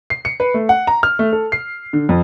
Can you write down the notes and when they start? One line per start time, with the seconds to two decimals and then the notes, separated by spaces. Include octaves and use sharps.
0.10 C7
0.25 C#7
0.40 B4
0.54 A3
0.69 F#5
0.87 A#5
1.03 F6
1.19 A3
1.32 A4
1.52 C7
1.93 D3
2.09 F2